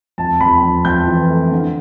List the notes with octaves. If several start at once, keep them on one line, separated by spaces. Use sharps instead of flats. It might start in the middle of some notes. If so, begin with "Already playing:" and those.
F2 A5
F2 B5
F2
F2 G6
E3
A3
D3